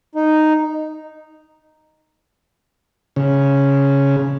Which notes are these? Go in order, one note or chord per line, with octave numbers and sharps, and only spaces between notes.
D#4
C#3